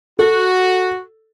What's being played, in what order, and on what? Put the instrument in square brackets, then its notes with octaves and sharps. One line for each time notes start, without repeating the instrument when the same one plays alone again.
[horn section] F#4 [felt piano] A4